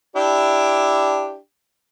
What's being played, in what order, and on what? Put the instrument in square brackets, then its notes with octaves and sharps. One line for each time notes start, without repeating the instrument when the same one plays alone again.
[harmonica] D4 E4 G4